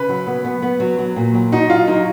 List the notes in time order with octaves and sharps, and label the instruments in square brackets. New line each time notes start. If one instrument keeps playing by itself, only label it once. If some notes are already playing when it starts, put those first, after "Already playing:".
Already playing: [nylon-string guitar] C#3 [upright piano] B4
[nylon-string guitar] F#3
B3
B3
B3
F#3
F#3
A#2
F#3
[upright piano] D#4 [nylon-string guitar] F#4
[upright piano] F4 [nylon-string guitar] F#4
[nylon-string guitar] F#3 [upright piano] D#4